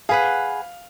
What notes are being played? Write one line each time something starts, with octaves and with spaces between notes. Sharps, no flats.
G#4 B4 F5 F#5